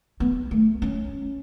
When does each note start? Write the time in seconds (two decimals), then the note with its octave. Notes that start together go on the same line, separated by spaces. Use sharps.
0.20 B3
0.51 A3
0.82 C#4